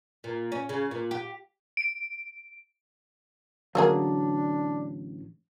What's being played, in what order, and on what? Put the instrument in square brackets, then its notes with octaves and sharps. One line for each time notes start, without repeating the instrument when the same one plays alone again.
[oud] A#2
C#4
C#3
A#2
G4
[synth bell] D7
[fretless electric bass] A1 D3 F#3 [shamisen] A3 A#3 G#4 [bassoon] D4